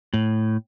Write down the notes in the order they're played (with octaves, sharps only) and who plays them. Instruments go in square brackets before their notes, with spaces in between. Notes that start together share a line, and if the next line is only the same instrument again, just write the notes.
[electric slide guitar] A2